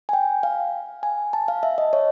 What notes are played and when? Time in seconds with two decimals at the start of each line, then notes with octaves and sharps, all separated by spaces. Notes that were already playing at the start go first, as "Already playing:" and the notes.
0.09 G#5
0.13 G5
0.43 F5
1.03 G#5
1.33 A5
1.48 F5
1.63 E5
1.78 D#5
1.93 C#5